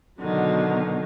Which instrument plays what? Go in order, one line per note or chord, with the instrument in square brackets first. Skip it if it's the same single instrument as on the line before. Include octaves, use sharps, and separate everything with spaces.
[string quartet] B2 D3 D#3 F#3